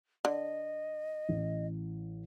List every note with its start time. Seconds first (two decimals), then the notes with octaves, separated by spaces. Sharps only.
0.25 D3 D#5
1.29 A1